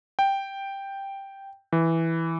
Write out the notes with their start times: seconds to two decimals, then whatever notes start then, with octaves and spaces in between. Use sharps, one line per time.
0.19 G5
1.73 E3